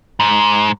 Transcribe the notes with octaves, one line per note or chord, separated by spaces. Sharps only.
G#2